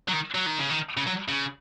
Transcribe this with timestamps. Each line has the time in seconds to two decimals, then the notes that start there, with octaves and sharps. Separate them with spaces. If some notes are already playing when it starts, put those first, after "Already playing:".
0.08 F#3
0.13 D#3
0.35 F#3
0.46 D#3
0.59 C#3
0.70 D#3
0.97 C#3
1.07 F#3
1.28 C#3